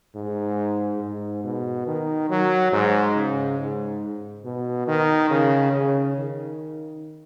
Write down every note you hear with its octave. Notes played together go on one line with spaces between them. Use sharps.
G#2
G#2
B2
D#3
F#3
G#2
C#3
G#2
B2
D#3
C#3
C#3
D#3